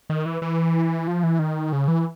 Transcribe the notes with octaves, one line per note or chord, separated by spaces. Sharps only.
D#3
E3
E3
F3
E3
D#3
C#3
E3